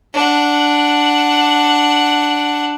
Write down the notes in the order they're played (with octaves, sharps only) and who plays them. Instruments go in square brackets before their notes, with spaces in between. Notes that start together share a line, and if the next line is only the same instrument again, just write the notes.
[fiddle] D4 F#5